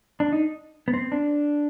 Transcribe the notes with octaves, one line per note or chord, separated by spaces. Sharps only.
D4
D#4
B3
C4
D4